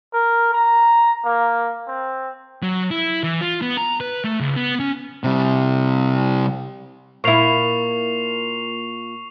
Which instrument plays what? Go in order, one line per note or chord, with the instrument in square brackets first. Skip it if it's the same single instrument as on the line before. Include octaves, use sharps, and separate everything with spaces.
[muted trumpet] A#4
A#5
A#3
C4
[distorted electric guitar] F#3
E4
E3
F4
B3
A#5
B4
A3
C#2
B3
C#4
[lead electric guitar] C3 G3
[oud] A#2 E4 [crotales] C#6 C7 F7